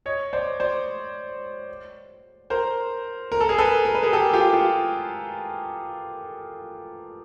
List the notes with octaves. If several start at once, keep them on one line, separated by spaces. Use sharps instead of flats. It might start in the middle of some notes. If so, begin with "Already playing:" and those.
C#5 D#5
C5 D5
C5 D5
A#4 C5
A#4
A4
G#4 A#4
A4 B4
A#4
B4
G#4 A#4
G4 A4
F4 G4
F4 G4